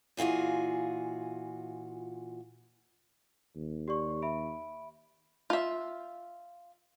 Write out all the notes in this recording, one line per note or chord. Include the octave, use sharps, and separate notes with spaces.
A#2 E3 F4 F#4 G#4
D#2
G4 D5 C#6
E5 B5 D7
F4 E5